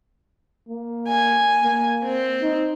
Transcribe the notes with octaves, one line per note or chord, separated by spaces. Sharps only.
A#3
G#5
A#3
C4
D#4